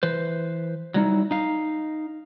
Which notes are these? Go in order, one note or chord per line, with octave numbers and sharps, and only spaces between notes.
E3 B4 C5
F#3 G3 D#4 E4
D#4 F5